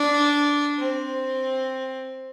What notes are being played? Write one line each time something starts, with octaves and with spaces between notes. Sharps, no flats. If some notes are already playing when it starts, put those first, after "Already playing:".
Already playing: D4
C4